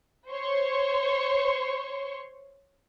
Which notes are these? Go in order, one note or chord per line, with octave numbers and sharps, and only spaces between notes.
C5 C#5 C6 C#6